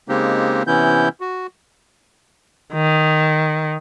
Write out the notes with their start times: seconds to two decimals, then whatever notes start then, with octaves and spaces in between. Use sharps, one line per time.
0.09 C#3 G#3 A#3 C4 D#4 G4
0.67 C3 E3 B3 C#4 E4 G6
1.20 F#4
2.74 D#3